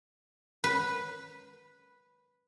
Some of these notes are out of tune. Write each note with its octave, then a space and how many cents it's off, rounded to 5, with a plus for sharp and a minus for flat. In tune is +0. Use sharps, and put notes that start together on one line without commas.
B4 -5